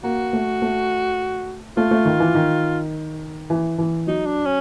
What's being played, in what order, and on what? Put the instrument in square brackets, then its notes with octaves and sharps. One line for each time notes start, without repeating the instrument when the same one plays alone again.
[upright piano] A#3 [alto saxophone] F#4
[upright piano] A3
A3
[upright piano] A3 [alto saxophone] F4
[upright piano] A3
D#3
E3
D#3
E3
E3
[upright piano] F#3 [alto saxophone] D#4
[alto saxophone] D4
C#4